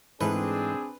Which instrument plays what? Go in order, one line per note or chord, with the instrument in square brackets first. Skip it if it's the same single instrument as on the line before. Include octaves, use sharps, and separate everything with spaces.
[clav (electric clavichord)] G#2 E3 A3 [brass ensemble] C4 D4 [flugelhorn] G#4 [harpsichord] B4